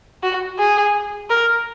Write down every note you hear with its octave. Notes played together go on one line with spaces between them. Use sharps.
F#4
G#4
A#4